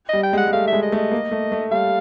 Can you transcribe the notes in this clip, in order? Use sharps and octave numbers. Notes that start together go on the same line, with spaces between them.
G3 D#5
G5
G#3
F#5
G#3
A3 F5
E5
G#3
D#5
A3
D#5
A#3
A3
A3
G3 F5